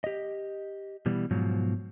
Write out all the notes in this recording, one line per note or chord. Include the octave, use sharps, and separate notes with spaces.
G4 D#5
B2 E3 G3
G#2 B2 F3 F#3